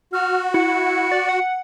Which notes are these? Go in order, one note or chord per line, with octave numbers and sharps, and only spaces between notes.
F#4 F6
E4 C#7
D5
F#5